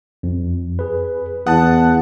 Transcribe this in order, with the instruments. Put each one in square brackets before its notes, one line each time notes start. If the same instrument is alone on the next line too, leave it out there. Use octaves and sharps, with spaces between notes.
[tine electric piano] F2
G#4 B4
[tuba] E2 [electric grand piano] F#5 A5 [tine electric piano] D#6